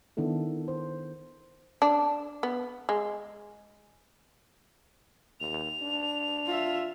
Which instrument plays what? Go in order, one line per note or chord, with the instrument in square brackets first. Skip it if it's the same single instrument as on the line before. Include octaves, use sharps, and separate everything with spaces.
[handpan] D#3 B3 D4 E4 A4
C5
[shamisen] D4
B3
G#3
[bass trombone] D#2 [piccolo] F7
[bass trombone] D4
[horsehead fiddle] F4 E5